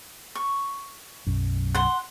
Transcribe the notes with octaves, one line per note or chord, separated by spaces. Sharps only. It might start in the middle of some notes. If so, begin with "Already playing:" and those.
C#6
B1 F#2
F#5 C6